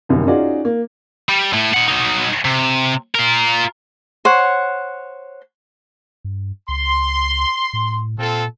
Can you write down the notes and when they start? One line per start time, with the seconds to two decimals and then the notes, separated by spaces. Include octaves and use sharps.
0.09 G1 C2 F#2 D#3 G3
0.27 C#4 D#4 F4 F#4 G#4 D5
0.65 A#3
1.29 G3
1.53 A2 A3
1.74 D#4 F#5
1.88 F#3 D#4
2.45 C3
3.15 F4 A#4
4.25 C5 C#5 F#5
6.24 G2
6.69 C#2 C6
7.73 A2
8.18 A#2 C4 F4 A4